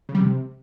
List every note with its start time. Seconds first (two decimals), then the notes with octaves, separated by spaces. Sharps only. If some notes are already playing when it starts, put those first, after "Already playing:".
0.09 C#3
0.15 G3
0.20 C3